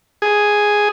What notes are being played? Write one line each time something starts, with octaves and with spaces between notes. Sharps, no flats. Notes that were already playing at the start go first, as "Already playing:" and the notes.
G#4